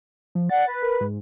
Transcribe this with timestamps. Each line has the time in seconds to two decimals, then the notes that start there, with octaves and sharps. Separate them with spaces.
0.35 F3
0.49 D5 F#5 A6
0.67 B4
0.82 A#4
1.01 G#2